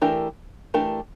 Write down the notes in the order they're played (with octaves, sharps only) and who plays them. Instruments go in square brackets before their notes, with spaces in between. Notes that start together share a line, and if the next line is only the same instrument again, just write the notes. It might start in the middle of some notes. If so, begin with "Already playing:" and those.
[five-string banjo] E3 A3 D4 G4 A#4
E3 A3 D4 G4 A#4